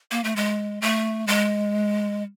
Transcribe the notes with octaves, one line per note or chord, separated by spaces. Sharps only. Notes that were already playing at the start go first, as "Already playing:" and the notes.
A#3
A3
G#3
A3
G#3